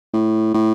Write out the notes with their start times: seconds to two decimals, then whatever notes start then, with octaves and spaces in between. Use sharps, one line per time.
0.13 A2
0.54 A2